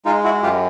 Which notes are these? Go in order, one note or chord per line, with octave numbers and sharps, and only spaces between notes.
G#3 D#4 F4
E4 F#4
F#2 F4 G4